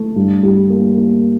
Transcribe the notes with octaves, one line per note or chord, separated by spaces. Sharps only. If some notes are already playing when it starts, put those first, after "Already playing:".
Already playing: A3
G2
G3
A#3
A#3